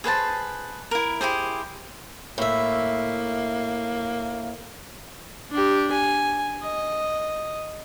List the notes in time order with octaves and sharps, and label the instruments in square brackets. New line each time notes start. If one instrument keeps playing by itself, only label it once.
[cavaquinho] G#4 B4 C5 A5
E4 A#4
E4 G4 G#4 C5
[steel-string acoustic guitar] A2 E5 [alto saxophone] A#3
[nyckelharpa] D4 G4
G#5
D#5